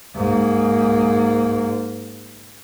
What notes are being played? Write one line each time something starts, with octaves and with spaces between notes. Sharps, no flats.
G#2 A#3